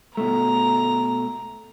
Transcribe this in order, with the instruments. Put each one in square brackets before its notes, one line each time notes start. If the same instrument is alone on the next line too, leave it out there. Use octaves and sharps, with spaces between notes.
[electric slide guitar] B2 A3 [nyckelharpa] A#5